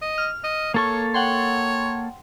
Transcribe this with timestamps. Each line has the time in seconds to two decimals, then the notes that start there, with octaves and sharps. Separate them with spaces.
0.02 D#5
0.18 F6
0.44 D#5
0.74 A#3 A4 C#5 C#6
1.14 C#5 F#5 G5 C6